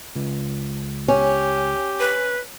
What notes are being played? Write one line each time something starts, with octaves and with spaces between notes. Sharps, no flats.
C#2
C#4 G4
B4